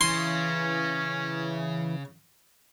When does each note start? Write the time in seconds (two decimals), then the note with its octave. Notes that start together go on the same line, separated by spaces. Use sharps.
0.01 C#3 E3 C#4 C6